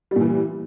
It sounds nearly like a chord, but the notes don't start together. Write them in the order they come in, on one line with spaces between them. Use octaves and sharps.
G3 A#2 E3